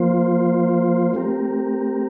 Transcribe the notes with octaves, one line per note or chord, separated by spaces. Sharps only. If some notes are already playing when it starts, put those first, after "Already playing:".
Already playing: F3 A#3 F4 C5
A3 C4 G4 A#4